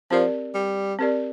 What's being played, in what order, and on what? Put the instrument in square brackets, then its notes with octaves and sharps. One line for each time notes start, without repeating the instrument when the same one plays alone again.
[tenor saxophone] F3 [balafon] C4 G4 A#4 D5
[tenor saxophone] G3
[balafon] C4 G4 A#4 D5